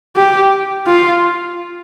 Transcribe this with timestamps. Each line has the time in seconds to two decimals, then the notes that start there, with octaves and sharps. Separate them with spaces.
0.17 G4
0.87 F4